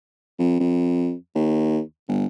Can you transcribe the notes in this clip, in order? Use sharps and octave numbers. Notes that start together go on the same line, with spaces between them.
F2
F2
D#2
G1